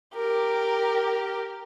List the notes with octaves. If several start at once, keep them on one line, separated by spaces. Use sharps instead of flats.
G4 A#4